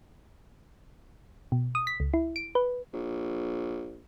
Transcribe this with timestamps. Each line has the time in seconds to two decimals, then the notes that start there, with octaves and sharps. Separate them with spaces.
1.52 B2
1.75 D#6
1.87 B6
2.00 C#2
2.14 E4
2.36 D7
2.55 B4
2.93 A#1